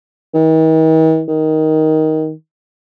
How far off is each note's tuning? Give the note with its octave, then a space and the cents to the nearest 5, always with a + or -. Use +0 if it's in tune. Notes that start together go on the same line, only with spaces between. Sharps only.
D#3 +45
D#3 +10